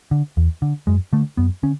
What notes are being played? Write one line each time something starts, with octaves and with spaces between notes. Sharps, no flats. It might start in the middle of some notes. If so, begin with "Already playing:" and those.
D3
E2
D3
F#2 G#3
D3 A3
F#2 B3
D3 C#4